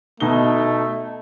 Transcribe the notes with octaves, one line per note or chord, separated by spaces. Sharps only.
B2 A3 D#4 G7